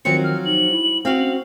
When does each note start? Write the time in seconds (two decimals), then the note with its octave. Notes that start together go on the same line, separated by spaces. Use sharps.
0.05 D#3 F3 F#3 C4 C#7
0.24 F6
0.45 D#4 F#7
0.71 E4
1.05 C4 F#4 F5
1.18 C#4